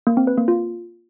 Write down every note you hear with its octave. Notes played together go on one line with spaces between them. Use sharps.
A#3
C4
B4
A#3
F4